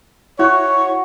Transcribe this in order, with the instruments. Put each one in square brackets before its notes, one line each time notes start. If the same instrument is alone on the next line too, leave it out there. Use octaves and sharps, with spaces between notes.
[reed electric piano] E4 [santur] F#4 [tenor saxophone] C#5